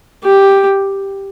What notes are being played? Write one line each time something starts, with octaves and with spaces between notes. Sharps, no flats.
G4